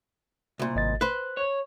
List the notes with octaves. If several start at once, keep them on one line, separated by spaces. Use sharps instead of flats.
C2 A#2
G#1 D#5 A6
B4 C5 F#6
C#5